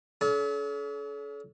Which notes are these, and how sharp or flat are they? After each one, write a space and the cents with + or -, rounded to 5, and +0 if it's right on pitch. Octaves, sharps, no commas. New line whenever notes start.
C#4 +40 A4 -40